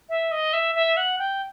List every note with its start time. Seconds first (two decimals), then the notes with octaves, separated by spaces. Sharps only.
0.09 E5
0.31 D#5
0.53 E5
0.75 E5
0.97 F#5
1.19 G5